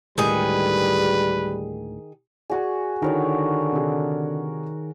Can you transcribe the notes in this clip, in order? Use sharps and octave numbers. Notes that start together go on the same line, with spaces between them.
D2 A2 D#3 G3 G#3 G#4 B4
F#4 G#4 D5 G#5
D3 D#3 E4 F#4 A#4 C#5 D5
C3 D#4 G#4